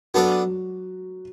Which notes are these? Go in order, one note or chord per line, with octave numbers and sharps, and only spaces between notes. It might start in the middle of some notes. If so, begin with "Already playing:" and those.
F#3 B3 D4 F#4 A4 D5